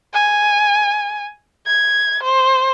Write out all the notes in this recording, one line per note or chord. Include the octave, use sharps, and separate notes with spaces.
G#5
G#6
C5